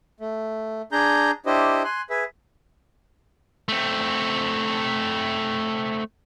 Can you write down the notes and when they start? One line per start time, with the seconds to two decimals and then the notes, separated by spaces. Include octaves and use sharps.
0.20 A3
0.92 D4 G#4 A#5 G6
1.46 D4 E4 G4 C5 D#5
1.84 G#5 C6 F#6
2.10 G#4 B4 E5
3.68 A3 C4